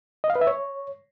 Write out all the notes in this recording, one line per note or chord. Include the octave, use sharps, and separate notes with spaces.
D#5
F5
B4
E5
C#5